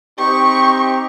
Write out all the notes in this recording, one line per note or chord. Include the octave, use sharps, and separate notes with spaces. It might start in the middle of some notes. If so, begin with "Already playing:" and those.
C4 D#4 G4 C#6